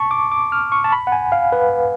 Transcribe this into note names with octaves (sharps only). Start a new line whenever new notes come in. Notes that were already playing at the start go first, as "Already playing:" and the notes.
Already playing: A5 C#6
D6
D6
F6
C#6
A5
B5
F#5
G#5
F5
B4